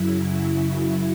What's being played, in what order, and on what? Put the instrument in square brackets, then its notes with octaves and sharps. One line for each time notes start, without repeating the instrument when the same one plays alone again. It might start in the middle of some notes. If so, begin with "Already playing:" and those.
Already playing: [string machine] F#2 C#3 F#3 E4